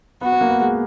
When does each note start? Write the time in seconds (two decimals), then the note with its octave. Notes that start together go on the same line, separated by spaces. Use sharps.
0.21 B3 F#4
0.32 B3
0.41 A#3
0.50 B3
0.61 G#3